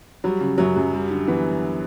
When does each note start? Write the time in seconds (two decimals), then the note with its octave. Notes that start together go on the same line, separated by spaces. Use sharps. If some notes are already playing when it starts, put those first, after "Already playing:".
0.24 F#3 G3
0.41 C#3
0.58 F#2 F#3
0.76 F#2
0.93 G3
1.11 D3
1.28 E3 B3